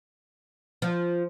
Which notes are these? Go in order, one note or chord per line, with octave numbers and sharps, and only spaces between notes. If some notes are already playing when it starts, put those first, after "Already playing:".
F3